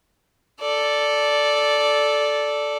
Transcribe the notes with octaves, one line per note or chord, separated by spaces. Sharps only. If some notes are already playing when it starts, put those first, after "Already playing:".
A4 D5